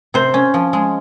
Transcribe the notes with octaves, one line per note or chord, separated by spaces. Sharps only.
C3 C5
C#4
F3
G#3